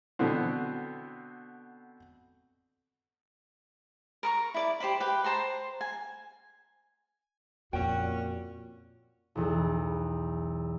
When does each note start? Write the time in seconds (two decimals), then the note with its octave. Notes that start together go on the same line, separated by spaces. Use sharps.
0.19 B2 D3 B3 C4
4.23 A#4 A#5 C#6
4.54 E4 D5 D6
4.80 G4 C5 D#5 B5
5.00 G4 B4
5.24 C5 A5 A#5 C6
5.81 G#5
7.73 F2 A#2 G3 C#4 F#4 G5
9.35 B1 E2